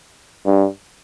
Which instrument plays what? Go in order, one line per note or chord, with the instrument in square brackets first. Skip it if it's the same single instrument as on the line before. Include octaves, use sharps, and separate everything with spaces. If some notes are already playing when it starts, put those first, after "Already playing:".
[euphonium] G2